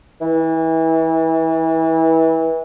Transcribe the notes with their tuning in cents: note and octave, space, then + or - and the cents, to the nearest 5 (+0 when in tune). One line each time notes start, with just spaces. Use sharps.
E3 -25